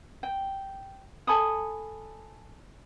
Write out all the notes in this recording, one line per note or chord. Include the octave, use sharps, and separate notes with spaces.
G5
A4 G#5 B5 D#6